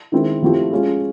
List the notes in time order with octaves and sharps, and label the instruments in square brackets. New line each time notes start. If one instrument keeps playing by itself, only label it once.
[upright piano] D#3 G#3 C4 E4
F3 A3 C4 E4 G4
G#3 C#4 F4 G#4